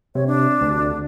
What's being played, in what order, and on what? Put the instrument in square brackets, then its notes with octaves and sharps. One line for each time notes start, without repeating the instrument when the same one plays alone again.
[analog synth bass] C3 [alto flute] C#5
[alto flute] D4
[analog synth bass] D2